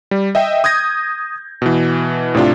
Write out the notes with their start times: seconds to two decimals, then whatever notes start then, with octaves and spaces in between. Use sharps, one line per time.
0.11 G3
0.35 D#5 E5 G5
0.64 D#6 G6 G#6 A#6
1.62 B2 E3
2.35 A2 C3 D4 F4